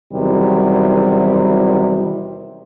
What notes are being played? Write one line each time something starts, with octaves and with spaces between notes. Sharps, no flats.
E2 C3 D#3 F#3 G3 E4